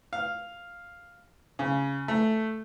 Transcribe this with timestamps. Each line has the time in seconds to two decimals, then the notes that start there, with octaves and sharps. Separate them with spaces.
0.13 F5
1.59 C#3
2.08 A3